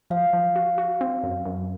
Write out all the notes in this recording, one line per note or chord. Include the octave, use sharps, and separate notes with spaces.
F3 F5
F3
F#4
F#4
C4
F#2
F#2